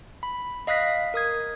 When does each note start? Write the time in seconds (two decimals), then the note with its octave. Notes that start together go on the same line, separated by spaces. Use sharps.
0.23 B5
0.67 D#5 F5 D#6 F#6 A#6 B6
1.14 A#4 D#6 G#6